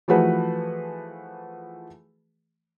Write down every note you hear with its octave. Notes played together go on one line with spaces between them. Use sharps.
E3 F3 A3 F#4 G#4 B4